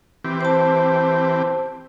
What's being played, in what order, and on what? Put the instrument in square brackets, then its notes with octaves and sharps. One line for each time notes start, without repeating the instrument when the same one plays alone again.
[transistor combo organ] E3 C4 G4
[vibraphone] C5 A5